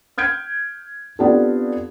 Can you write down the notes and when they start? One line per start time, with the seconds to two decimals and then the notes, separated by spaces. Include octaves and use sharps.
0.18 F6 G6 G#6 D7
1.19 B3 C4 D4 F4 G4 A4